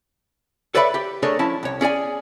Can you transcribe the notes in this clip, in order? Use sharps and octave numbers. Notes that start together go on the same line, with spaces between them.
A4 B4 C#5 D5 E5 B5
G4
A3 D4 G#4 A#4 C#5
F3 C#4 E4 A5
C2 C#5
C#4 G#4 D5 G#5